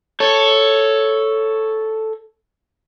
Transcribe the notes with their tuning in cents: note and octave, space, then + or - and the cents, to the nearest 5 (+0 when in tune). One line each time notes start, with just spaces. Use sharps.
A4 +0 C#5 +0